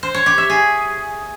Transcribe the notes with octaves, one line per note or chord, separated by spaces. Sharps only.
C5
C#5
G4
E5
G#4